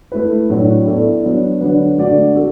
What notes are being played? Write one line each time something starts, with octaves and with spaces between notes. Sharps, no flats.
A3 E4 B4
A2 F#3 D4 F#4
B3 E4 A4 D5
F#3 B3 D4
D3 F#3 D4 B4
D3 A3 F#4 D5
A3 F#4 A4